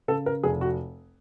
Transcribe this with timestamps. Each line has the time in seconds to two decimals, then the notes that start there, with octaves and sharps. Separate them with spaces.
0.08 C#3 A4
0.26 A#4
0.43 F1 G#4
0.61 F#4